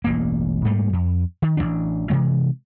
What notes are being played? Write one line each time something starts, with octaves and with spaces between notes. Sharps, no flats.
E1 A1 G2 A#3
G#2 G3 A3 A#3
F2
D#3
A1 D3 E3 D4
C3 E3 G#3